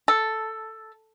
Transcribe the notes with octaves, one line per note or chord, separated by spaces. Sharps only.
A4